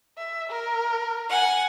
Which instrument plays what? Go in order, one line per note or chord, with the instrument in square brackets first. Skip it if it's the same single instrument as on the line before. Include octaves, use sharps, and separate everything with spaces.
[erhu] E5
A#4
[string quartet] F#5 G#5